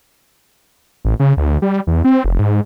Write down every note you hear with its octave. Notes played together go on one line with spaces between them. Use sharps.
A1
C#3
D2
G3
E2
C4
F1
G#2